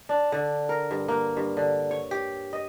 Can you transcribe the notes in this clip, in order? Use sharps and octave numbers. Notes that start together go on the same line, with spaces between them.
D4
D3
A#4
G2
A#3
G2
D3
C#5
G4
D#5